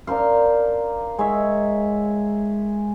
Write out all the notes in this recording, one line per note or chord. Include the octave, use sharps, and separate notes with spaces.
D4 A#4 C5 F5
G#3 C#5 E5